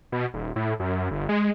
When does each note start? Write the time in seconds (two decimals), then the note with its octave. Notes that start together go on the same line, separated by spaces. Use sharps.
0.12 B2
0.34 D#1
0.56 A2
0.80 F#2
1.11 G1
1.29 G#3